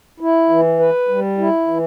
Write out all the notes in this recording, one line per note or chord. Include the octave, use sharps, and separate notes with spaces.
E4
E3
B4
G3
E4
E3